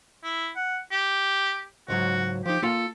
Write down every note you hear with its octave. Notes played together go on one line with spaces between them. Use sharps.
E4
F#5
G4
C#2 G#2 F#3 F#4
F3 D#4 G4
A#3 F4 A4 F5